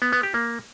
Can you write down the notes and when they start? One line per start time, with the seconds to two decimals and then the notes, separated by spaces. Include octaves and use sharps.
0.02 B3
0.13 B3
0.23 G4
0.34 A#3